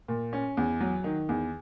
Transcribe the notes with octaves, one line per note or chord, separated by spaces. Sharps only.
A#2
C#4
E2
F#3
D#3
E2